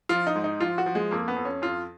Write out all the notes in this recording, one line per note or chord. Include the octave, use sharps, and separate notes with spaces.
F3 F4
D#4
G#2
D#4
F3 F4
F#4
F3
G#3
F2 A#3
B3
F2
C#4
F2 F4